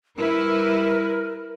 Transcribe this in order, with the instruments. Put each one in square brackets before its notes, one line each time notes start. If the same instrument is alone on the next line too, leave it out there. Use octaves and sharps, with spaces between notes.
[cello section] G3 E4 B4 [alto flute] A#4